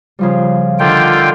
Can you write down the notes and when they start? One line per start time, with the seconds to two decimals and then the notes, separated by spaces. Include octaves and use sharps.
0.19 C#3 F3 G3
0.79 D3 D#3 D4 F4 G5